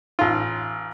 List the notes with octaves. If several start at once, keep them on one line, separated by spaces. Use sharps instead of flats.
A1 F4